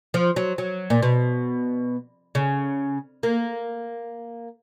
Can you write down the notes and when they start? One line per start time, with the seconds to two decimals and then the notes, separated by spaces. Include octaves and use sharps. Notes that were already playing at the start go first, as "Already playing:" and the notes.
0.14 F3
0.36 F#3
0.58 F#3
0.90 A#2
1.02 B2
2.35 C#3
3.23 A#3